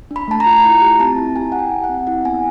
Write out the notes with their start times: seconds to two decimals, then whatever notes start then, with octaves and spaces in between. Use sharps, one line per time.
0.11 D4
0.16 B5
0.28 A3 A5
0.40 A#5
0.46 F4
0.64 E4 A#5
0.82 G4
1.00 C4 A5
1.17 E4
1.36 G4 G#5
1.52 E4 F#5
1.59 G5
1.71 G4
1.84 F#5
1.89 C4
2.07 E4 F#5
2.24 B3 G#5